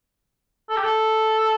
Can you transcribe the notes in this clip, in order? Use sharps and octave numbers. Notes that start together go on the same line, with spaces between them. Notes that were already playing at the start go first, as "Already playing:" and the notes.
A4
G4
A4